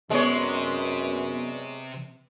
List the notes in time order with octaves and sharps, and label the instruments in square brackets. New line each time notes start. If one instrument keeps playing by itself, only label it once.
[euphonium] F#2 [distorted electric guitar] C3 [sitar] G#3 C#5 [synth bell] B3 B4 D5